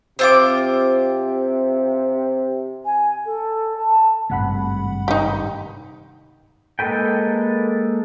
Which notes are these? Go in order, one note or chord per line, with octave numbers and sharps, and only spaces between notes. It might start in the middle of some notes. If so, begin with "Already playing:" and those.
C3 C4 F4 D6
G#5
A4
A5
G#1 G2 C3 A3 F#5 B5
D#4 G4
G#3 A#3 A4 B4 G5